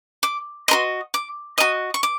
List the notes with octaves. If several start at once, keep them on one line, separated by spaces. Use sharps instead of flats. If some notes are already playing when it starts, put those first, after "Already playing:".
D6
F#4 A#4 D#5 C6
D6
F#4 A#4 D#5 D#6
C#6
D6